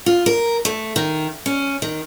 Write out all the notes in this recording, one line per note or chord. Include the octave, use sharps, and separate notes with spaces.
F4
A#4
A3
D#3
C#4
D#3